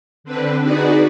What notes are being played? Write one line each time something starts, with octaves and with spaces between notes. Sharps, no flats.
D3 C4 D4 B4
D#4 F#4 G#4 B4 D5